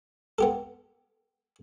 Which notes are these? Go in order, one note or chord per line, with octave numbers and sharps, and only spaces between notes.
B3 G4 A4